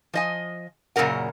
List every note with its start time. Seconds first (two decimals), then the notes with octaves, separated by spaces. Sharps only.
0.13 F3 D#5 G#5
0.96 F#2 A#2 C#3 F3 A#4 F#5